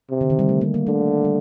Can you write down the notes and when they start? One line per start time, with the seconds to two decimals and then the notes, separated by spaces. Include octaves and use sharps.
0.11 C3
0.21 D3
0.30 D#3
0.39 G3
0.49 A3
0.61 A#3
0.74 A#3
0.86 D3 A3
1.24 G3